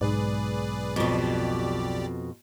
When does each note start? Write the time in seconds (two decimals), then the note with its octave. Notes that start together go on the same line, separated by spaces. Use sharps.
0.01 B1 G#2 G#4 B4 D5
0.96 F2 B2 G4 D5